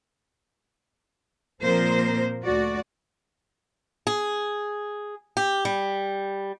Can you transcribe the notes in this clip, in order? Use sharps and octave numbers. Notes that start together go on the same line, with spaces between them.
A#2 F3 A#3 C4 A#4 C5
D2 F#4 D5
G#4
G4
G3